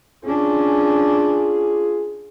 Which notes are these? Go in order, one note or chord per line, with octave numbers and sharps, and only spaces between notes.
C#4 D4 F4 G#4